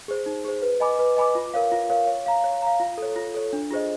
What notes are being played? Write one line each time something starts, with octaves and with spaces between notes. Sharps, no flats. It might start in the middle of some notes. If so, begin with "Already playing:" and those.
G#4 C5
D#4
G#4 C5
B4
D#5 G#5 B5 D6
B4
D#5 G#5 B5 D6
F4
A#4 C#5 F5
F4
A#4 C#5 F5
C#5
F5 A#5
C#5
F5 A#5
F4
A4
C#5
F4
A4 C#5
D4
F4 G#4 C5 D#5